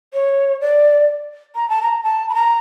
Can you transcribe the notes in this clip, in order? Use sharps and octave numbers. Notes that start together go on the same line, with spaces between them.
C#5
D5
A#5
A5
A#5
A5
B5
A#5